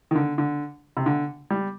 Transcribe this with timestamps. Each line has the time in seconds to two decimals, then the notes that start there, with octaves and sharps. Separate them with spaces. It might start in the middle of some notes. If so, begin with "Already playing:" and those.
0.11 D#3
0.15 D3
0.38 D3
0.97 C3
1.06 D3
1.50 G3